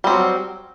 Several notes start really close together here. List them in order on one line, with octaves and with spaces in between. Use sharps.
G3 C4 F#3